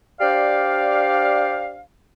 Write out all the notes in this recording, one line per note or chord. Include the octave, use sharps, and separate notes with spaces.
D4 G4 C5 D5 F5